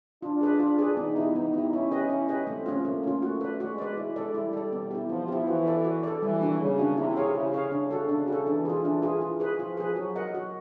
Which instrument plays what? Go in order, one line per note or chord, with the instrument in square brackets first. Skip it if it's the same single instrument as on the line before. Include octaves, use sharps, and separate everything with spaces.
[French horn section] D4 [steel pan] F4
[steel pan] G#4 B4 D5
F4
G#4 B4 D5
[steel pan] B3 [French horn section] D#4
[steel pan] E4 G4
[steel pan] B3 [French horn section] D#4
[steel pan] E4 G4
[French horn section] C#4 [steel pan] E4
[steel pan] G4 B4 D#5
E4
G4 B4 D#5
[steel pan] A3 [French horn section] C4
[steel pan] C#4 F4
[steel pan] A3 [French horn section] A#3
[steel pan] C#4 F4
[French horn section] A3 [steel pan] F#4
[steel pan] B4 D5
[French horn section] G#3 [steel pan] F#4
[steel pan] B4 D5
[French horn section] G#3 [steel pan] E4
[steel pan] A4 D5
[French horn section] G3 [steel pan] E4
[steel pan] A4 D5
B3
E4 G4
[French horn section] F3 [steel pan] B3
[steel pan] E4 G4
[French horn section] E3 [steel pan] F#4
[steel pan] A4 D5
F#4
A4 D5
[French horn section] E3 [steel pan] G3
[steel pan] A#3 D4 F#4
[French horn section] C#3 [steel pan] G3
[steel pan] A#3 D4 F#4
[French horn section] C3 [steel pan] E4
[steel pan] G#4 C#5 F5
[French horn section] C#3 [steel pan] E4
[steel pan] G#4 C#5 F5
[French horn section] C#3 [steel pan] D4
[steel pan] F#4 A4
[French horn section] C#3 [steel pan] D4
[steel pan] F#4 A4
[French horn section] E3 [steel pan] D4
[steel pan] F4 G#4
D4
F4 G#4
F4
G#4 B4
[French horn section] F3 [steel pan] F4
[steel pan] G#4 B4
[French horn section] F#3 [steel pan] F#4
[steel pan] A#4 D#5 F#5
F#4